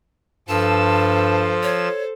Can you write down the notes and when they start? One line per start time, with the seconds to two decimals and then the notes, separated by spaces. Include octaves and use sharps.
0.49 G2 F3 A4 C5 A5 E6
1.63 C#5